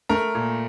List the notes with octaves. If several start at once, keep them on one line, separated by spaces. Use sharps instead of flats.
A3 A#4 A#5
A#2